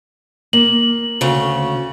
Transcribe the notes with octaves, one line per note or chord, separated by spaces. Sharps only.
A#3 F#7
D2 C#3